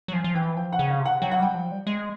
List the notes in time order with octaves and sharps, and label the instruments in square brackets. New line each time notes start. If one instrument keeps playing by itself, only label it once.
[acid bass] F#3
[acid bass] F3 [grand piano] G#5
[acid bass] F3
[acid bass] E3 [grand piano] G5
[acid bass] F3 [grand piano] G5
[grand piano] F#5
[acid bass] C#3
[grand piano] F5
[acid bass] C3
[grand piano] F#5
[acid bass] F#3 [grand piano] G5
[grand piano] F#5
[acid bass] G3 [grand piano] G5
[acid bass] F3
G3
G#3